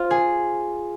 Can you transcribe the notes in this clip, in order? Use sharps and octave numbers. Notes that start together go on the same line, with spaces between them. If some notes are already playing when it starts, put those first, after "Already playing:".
Already playing: F4 C5
G#4